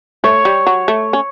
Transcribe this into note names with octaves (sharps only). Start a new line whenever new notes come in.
A3 C#5
G3
F#3
A3
C#4